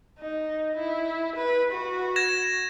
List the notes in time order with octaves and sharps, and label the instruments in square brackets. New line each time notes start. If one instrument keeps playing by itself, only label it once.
[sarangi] D#4
E4
B4
F#4
[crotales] G#6 A#6 E7